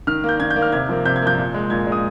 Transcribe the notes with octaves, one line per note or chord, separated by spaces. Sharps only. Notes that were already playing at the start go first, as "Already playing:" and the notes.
D#3 F6
A#3 G6
D#3 G#6
G6
A#3
F6
C3 G#6
F3 A#3
C3 G6
G#6
F3 A#3 G6
A#2
G#3
A#2 G#6
G#3
D#6